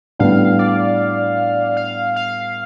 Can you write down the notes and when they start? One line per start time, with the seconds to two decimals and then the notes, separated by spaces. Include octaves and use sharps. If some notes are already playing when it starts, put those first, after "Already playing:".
0.19 A2 G3 B3 D4 F5
0.59 D5
1.77 F5
2.16 F5